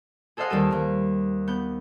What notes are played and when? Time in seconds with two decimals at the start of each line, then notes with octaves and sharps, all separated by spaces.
0.37 G#4 A4 C5 D#5 F5 F#5
0.50 D#2 G3 G4 A4 D#7
0.71 D#2 A#3
1.48 B3 G6